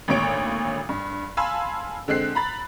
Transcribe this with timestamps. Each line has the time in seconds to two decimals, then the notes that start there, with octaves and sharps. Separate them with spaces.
0.08 G#1 D2 A#2 C#5 D7
0.89 G2
1.37 F5 G#5 A5 B5 C6 E6
2.08 D3 G#3 C4 F#6 C7
2.35 A#5 B5 A6